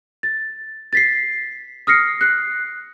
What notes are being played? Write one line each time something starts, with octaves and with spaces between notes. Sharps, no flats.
A6
A6 B6 C7
D#6 F6 A#6 C7 C#7
F#6 C7